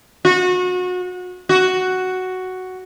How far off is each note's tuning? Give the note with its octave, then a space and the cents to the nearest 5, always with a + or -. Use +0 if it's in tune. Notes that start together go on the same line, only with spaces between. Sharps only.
F#4 -30
F#4 +5